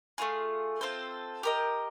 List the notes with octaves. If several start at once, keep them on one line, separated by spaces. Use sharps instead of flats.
A3 C4 F4 G#4
C4 F4 A4 C5
G4 A#4 D#5